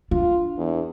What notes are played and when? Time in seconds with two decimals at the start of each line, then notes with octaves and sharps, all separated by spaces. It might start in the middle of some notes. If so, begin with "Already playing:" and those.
0.11 D4 F4
0.58 E2